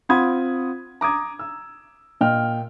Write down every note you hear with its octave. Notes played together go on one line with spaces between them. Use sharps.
C4 F4 F#5 B5 D#6 G#6
A#5 D6 D#6 G#6
E6
A#2 D#5 G5 F6